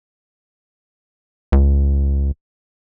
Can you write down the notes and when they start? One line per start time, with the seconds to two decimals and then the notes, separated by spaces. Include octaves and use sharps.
1.52 C#2